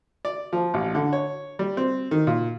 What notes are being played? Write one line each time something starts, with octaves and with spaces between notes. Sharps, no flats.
D5
F3
A1
D3
C#5
G3
C4
D#3
A#2